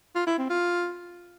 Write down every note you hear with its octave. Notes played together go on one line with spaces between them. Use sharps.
F4
E4
C4
F4